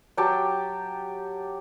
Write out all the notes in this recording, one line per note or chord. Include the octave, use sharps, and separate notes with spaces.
F#3 G4 G5 A5